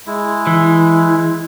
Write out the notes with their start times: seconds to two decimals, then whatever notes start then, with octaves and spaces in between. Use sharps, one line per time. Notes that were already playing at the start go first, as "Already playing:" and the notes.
0.07 G#3 E4
0.47 E3